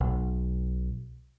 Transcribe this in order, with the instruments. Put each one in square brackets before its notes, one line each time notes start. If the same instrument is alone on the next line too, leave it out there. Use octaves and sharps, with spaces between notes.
[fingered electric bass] B1